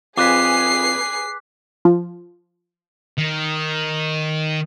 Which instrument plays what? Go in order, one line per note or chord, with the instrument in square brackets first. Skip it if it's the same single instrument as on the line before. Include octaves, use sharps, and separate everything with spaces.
[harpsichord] F2 [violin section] G#4 B4 G#5 [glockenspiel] D6 F#6 B6 [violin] C7
[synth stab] F3
[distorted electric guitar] D#3